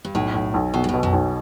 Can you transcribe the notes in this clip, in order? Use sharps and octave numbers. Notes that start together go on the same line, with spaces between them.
G2
B1 A2
B1
B1
B1 B2
G2
A2
B2
F#2
B1